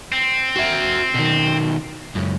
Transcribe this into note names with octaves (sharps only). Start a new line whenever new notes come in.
C4
F#4 E5
B2 D#3
C#2 F#2